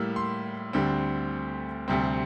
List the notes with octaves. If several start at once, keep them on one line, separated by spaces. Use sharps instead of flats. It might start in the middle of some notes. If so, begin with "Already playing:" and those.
Already playing: A2 G3 A#3 E6 F6
C6
D2 D3 G3 C4
D2 C3 G3 C4